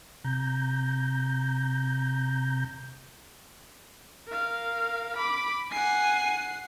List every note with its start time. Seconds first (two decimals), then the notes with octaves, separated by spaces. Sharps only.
0.25 C3 A#5 G6
4.27 A#4 F5
5.16 B5 D6
5.72 F#5 G#5 C7